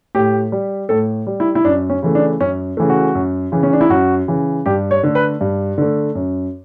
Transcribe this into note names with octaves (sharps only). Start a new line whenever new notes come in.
A2 G4
G3
A2 A4
G3
E4
E4
F#2 D4
C#4
C#3 E3 A3
D4
F#2 C#4
C#3 E3 A3
F#4
F#2
C#3 E3
C#4
D4
E4
F#2 F#4
C#3 E3
G2 G4
C#5
D3 A3
B4
G2
D3 A3
F#2